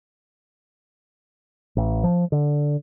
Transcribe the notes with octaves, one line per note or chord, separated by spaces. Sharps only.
A1
F3
D3